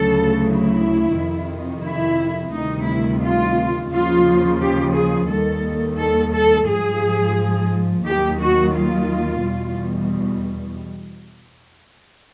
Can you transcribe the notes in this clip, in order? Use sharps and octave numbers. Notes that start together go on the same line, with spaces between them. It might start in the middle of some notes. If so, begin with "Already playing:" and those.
Already playing: D2 C#3 F#3 A4
E4
F2 C3 D#3
E4
D2 C3 D#3 G3 D#4
E4
F4
D#2 C#3 F3 F4
G4
G#4
D#2 D#3 G3 A4
A4
A4
G#2 F3 G#4
D#2 D#3 F#3 G4
F#4
F4
E2 B2 G3